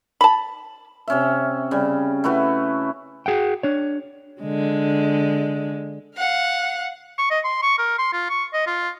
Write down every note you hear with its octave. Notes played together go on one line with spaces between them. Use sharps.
A5 B5
C3 C#4 E5
C#3 G3
A3 E4 F#4 B4
F#4 G#4 F#5 G5
D4 C#5
D3 G#3
F5 F#5
C#6
D#5
C6
C#6
A#4
C6
F4
C#6
D#5
F4